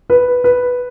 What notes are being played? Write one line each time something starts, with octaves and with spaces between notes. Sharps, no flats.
B4
B4